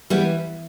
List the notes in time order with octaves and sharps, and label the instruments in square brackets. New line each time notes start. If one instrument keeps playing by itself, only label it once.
[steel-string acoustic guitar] E3 G3 B3